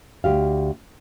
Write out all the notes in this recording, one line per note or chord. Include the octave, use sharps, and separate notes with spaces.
D2 G4 F5